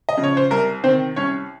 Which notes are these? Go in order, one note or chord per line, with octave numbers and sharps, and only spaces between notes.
D#5
C#3 F3
C#5
C5
C2 A#4
C3 D#3 C4 C5
C2 C#4 C#5